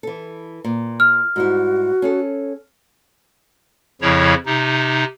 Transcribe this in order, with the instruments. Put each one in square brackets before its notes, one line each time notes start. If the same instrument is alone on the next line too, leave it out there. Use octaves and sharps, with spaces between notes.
[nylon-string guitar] E3 A4
A#2
[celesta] F6
[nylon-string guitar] G#2 G3 E4 [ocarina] F#4
[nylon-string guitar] C#4 G#4 A4
[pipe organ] F2 C#3 F3 E4 C#5
C3 D#4